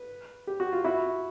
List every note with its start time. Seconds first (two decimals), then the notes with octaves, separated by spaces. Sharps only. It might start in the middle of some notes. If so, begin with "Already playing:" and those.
Already playing: B4
0.47 G4
0.60 F#4
0.73 F4
0.84 E4 F#4